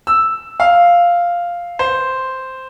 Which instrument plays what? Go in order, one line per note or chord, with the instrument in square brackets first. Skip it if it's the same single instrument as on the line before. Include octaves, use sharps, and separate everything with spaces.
[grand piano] E6
F5
C5